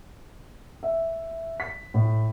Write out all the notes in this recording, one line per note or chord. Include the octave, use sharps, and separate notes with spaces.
E5
B6
A2